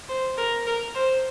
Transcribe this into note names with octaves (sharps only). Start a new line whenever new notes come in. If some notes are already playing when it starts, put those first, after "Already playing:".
C5
A#4
A#4
C5